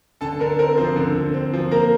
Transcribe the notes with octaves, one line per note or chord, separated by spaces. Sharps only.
D3 A4 A5
D3 A#4
C4 A#4
F3 C4 C5
D3
D3
C4
F3
A#3 A#4 A#5